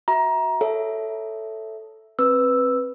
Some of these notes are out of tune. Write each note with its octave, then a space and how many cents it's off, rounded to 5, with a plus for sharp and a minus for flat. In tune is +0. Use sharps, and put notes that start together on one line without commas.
F#4 +0 E5 -25 A#5 +20
A4 +0 C#5 +15 E5 +0
C4 +25 B4 +0 E6 +0